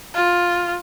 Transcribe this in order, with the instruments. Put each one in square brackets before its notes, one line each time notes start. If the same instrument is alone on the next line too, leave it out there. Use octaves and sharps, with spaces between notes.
[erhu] F4